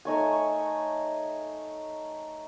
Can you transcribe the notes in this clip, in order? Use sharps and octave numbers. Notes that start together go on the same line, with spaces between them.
A3 D#4 C#5 G#5